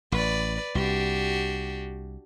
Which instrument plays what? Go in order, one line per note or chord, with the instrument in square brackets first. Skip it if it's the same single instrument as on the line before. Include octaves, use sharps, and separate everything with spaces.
[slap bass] A1 [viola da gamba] B4 D5
[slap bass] C2 [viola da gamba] D4 F#4 G4